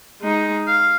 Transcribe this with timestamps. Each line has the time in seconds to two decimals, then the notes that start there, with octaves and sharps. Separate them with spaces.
0.21 G#3 D#4
0.67 F5